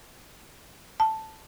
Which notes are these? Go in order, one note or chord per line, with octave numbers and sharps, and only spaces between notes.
A5